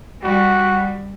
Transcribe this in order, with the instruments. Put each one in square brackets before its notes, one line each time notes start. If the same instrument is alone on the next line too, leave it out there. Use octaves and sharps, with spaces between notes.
[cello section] G3 [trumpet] F#4